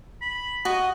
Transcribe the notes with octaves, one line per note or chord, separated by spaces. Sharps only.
B5
F#4 D#5